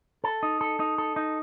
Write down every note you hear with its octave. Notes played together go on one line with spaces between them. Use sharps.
A4
D#4
A4
D#4
A4
D#4